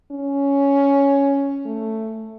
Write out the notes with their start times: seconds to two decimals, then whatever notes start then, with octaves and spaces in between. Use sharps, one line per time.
0.11 C#4
1.66 A3